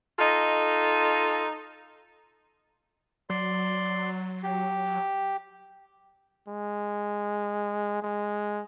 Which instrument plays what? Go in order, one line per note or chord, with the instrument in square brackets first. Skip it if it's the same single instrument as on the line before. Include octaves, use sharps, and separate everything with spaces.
[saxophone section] D#4 F4 A4 D#5
[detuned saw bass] F#3 [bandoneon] D5 C6
[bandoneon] G4
[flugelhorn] G#3
G#3